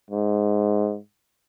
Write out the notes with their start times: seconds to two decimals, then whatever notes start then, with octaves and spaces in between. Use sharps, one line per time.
0.11 G#2